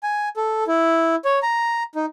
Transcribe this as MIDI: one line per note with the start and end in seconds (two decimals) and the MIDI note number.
0.03 0.29 80
0.37 0.64 69
0.67 1.15 64
1.25 1.39 73
1.43 1.83 82
1.95 2.06 63